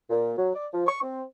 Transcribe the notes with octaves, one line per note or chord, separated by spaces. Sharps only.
A#2
F#3
D5
F3
C#6
C4